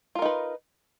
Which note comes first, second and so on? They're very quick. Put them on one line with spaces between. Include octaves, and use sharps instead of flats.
F4 A#4 D#4 B4